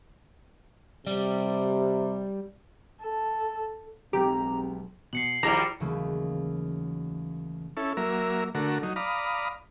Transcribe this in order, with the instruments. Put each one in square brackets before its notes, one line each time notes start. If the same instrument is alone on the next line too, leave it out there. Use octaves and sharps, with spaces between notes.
[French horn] C3 [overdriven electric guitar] G3
[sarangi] A4
[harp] B1 G#3 [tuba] C4 [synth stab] G4 [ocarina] A#5
[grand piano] B2 [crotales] C7 C#7 F#7
[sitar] D#3 F3 G3 [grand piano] E4 G#4 A#6 [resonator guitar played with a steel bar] A#5 [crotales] D6
[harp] D#2 C#3 E3 F#3 A3 A#3
[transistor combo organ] C#4 E4 A4
F#3 A#3 A#4 E5
D3 A3 F#4 A#4
F#3 D#4
D5 F5 A#5 B5 D#6